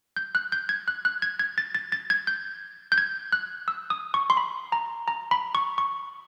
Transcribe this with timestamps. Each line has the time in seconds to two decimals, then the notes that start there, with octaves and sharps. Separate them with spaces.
0.17 G6
0.35 F#6
0.52 G6
0.69 G#6
0.88 F#6
1.05 F#6
1.22 G#6
1.39 G#6
1.58 A6
1.75 A6
1.92 A6
2.10 G#6
2.27 G6
2.92 G6
2.98 G#6
3.32 F#6
3.68 E6
3.90 D#6
4.14 C#6
4.30 C6
4.37 B5
4.72 A#5
5.08 A#5
5.31 B5
5.55 C#6
5.78 C#6